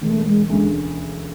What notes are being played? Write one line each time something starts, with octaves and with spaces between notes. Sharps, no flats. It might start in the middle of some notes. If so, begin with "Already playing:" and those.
E1 A3
G#3
D2 C#3 G#3